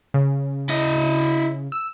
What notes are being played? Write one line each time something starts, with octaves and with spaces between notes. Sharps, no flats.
C#3
E4 D#5
E6